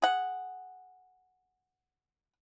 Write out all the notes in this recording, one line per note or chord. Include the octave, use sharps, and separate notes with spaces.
G#4 F#5